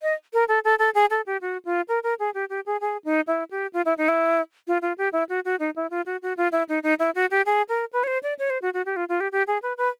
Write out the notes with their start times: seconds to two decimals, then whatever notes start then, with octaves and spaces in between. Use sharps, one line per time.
0.03 D#5
0.33 A#4
0.48 A4
0.65 A4
0.79 A4
0.95 G#4
1.10 A4
1.26 G4
1.41 F#4
1.65 F4
1.88 A#4
2.03 A#4
2.19 G#4
2.34 G4
2.50 G4
2.66 G#4
2.81 G#4
3.05 D#4
3.28 E4
3.51 G4
3.73 F4
3.86 E4
3.98 D#4
4.08 E4
4.67 F4
4.82 F4
4.98 G4
5.13 E4
5.29 F#4
5.45 F#4
5.60 D#4
5.76 E4
5.91 F4
6.06 F#4
6.22 F#4
6.37 F4
6.52 E4
6.69 D#4
6.83 D#4
7.00 E4
7.15 F#4
7.31 G4
7.46 G#4
7.69 A#4
7.93 B4
8.04 C#5
8.07 C5
8.23 D5
8.39 C#5
8.50 C5
8.62 F#4
8.74 F#4
8.86 G4
8.96 F4
9.09 F4
9.20 G4
9.32 G4
9.47 G#4
9.62 B4
9.78 B4